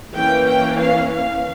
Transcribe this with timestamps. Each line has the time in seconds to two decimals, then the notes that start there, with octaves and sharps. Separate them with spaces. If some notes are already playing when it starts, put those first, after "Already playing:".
0.14 E3 A#3 C#4 G5
0.47 G5
0.79 F5
1.11 F5